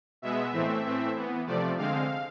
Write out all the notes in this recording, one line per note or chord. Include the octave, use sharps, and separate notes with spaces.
B2 G#3 B3 E5
A2 E3 A3 C4
A2 E3 A3 C4
E3 B3
C3 F3 A3 D5
D3 G#3 C4 F5